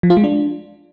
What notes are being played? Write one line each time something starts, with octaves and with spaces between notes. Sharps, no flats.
F3
F4
G#3
D4